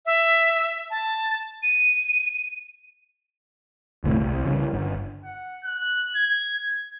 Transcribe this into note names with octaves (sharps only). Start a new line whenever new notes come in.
E5
A5
D#7
F#1 D2 A2 C3
C2
C#3 E3 G3
G1
F#5
F#6
G#6
G#6